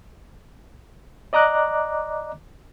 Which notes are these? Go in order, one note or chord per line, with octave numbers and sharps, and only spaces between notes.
D5 D#5 A#5 D6 F#6